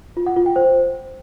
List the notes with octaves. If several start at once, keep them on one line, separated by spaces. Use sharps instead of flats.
F4
F#5
F4
G5
C5